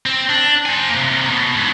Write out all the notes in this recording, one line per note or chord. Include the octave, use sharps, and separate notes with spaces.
C4
D4
C5 G#5
C3 A#3
B2
G#2 F#3